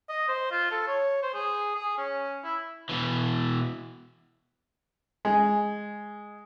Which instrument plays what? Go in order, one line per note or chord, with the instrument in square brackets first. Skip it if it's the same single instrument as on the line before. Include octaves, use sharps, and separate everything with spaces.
[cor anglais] D#5
C5
F4
A4
C#5
C5
G#4
G#4
C#4
E4
[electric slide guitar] B2 E3
[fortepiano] G#3